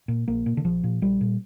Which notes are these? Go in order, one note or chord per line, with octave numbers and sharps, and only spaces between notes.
A#2
A#1 A#3
A#2
D3
A#1 F3
A#2
A#1 G3
A#2